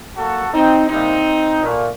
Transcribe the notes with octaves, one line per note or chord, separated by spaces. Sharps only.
F#2 F#3 A#3 F#4 A4
C4 D#4
C3 G3 A#3 C4 D#4
A#2 A3